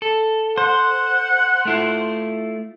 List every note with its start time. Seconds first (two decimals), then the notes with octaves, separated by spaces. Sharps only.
0.02 A4
0.58 C5 F#5
1.65 A3 E4 F4